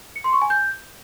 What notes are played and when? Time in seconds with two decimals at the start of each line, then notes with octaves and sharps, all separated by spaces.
0.16 C#7
0.24 C6
0.33 C#6
0.42 G#5
0.50 G6